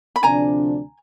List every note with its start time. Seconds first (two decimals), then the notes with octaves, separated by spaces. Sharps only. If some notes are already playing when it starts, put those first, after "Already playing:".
0.16 B5
0.23 D2 C3 F3 A3 D4 G#5 A#5